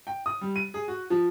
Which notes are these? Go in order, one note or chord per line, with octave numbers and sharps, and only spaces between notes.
G5
D#6
G3
D#7
G#4
F#4
F3